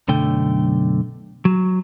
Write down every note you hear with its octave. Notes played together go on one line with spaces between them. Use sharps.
B1 F#2 D3 A3 G5
F#3